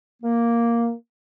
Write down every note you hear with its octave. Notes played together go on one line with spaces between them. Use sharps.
A#3